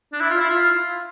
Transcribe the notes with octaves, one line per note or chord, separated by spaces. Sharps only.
D4
E4
F4
E4
F4